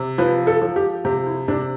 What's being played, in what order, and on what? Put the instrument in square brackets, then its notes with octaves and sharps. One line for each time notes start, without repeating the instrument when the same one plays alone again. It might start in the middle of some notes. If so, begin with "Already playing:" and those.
Already playing: [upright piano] C3
F3 B4
A4
F3
G4
C3 G4
E4
C3 D4